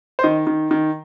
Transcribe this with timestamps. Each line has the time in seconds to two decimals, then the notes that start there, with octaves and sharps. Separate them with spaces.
0.19 C5
0.23 D#3 D#5
0.47 D#3
0.71 D#3